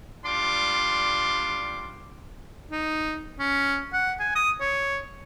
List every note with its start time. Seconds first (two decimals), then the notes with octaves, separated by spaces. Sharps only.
0.25 G3 D4 F4 C6 D6
2.71 D#4
3.39 C#4
3.93 F#5
4.20 G#5
4.35 D#6
4.60 C#5